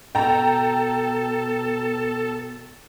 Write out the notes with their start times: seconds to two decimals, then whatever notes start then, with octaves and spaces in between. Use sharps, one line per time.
0.15 B2 A4 G5 A#5